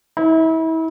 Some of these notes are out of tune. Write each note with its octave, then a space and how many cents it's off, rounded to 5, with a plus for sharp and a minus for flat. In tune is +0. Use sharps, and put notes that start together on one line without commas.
E4 -35